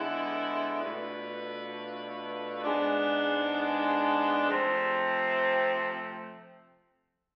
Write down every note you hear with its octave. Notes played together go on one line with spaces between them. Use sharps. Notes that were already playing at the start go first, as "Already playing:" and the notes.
Already playing: D3 G#3 B3 E4
B2 A3 D4 F4 B4
G#2 G#3 B3 D4
C3 F3 A3 C4